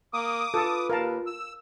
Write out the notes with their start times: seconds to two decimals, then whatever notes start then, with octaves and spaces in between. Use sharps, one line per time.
0.13 A#3 D6 D#6
0.54 F4 A4 B4 A5
0.90 D#2 A#4 F5 A5
1.26 E6